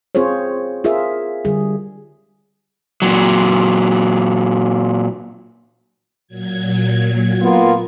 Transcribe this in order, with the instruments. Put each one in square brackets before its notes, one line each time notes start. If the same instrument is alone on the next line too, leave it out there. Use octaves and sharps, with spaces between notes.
[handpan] C4 F4 G#4 C5 C#5
F4 G#4 A#4 E5
D3 G3 G#4
[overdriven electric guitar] A#2 F#3
[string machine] A#2 F#3 G#6
[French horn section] A#3 B3 F4